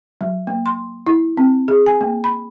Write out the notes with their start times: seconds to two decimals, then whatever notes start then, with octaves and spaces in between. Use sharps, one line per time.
0.21 F#3
0.47 A#3
0.66 C6
1.07 E4
1.37 C4
1.68 G#4
1.86 G#5
2.01 A#3
2.24 B5